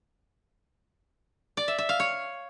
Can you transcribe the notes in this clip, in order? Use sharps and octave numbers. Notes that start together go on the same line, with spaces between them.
D5
E5
E5
F5
C#5